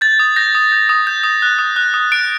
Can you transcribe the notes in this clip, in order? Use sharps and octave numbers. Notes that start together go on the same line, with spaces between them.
G6 A6
D#6
G6 A#6
D#6
G6
D#6
G6
D#6
F#6
D#6
F#6
D#6
F#6 D7